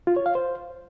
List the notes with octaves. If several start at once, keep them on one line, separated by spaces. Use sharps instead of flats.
F4
C#5
F5
C5